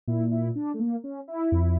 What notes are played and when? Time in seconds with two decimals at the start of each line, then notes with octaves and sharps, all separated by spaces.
0.08 A#2 E4
0.31 E4
0.55 D4
0.74 A3
0.79 A#3
1.04 C#4
1.28 E4
1.52 F2